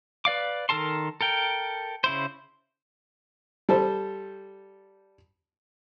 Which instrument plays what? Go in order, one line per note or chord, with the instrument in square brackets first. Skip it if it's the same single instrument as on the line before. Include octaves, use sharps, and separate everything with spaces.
[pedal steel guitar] B4 D5 F5 D6
D#3 A4 A#4 A5 C6
A4 A#4 G5
C#3 E4 C5
[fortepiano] G3 A4 C5